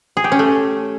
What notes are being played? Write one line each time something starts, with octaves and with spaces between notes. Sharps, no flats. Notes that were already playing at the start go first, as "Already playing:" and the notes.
G#4
G4
C#4
A3